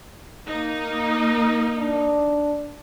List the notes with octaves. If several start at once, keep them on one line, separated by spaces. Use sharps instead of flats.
A#3 D#4
D4